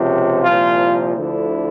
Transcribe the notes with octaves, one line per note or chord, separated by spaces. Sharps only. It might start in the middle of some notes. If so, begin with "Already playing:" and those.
Already playing: C#2 C3 F3
C2 A#2 F3 F4
D2 D3 F3 E4